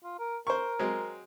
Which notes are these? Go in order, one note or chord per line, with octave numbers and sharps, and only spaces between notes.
F4
A#4
A#4 C5 C#6
F#3 G#3 C4